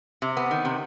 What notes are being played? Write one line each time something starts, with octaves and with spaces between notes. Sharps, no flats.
C3
B3
D#3
C3